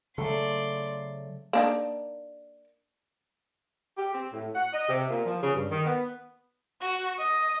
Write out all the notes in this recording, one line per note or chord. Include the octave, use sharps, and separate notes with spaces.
C#3 F#3 A3 D5 C6
A#3 D4 D#4
G4
C4
A2
F#5
D#5
C3
A#2
F3
C#3
G2
D#3
B3
F#4
D#5